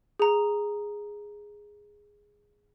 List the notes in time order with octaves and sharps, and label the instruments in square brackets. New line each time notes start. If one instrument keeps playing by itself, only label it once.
[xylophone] G#4 A#5